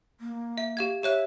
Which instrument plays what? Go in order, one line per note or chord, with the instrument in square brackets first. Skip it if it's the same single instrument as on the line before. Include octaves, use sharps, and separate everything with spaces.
[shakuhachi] A#3
[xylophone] E5
G4 F5 G#6
[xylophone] G4 C#5 F#6 [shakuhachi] E5